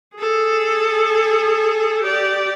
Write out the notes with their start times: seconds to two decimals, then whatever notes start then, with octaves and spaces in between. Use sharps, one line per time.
0.16 G#4 A4
2.02 G4 D5